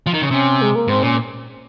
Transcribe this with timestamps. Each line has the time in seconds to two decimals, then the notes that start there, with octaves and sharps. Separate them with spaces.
0.06 F3
0.14 D#3
0.22 C#3
0.31 C3 C#4
0.62 G#3
0.75 A#3
0.88 G#2 C4
1.02 A#2 C#4